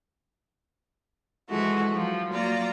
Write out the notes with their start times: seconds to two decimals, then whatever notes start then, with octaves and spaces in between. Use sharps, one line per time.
1.49 E3 F3 G#3 A3 F#4
1.94 F3 F#3
2.32 F#3 A#3 F4 D5 A#5